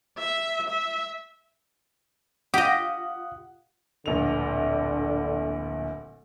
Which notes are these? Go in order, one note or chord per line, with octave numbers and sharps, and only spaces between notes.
E5
E5
F4 G4 D#5 F5 F#5 D#6
D1 A#1 D3 F7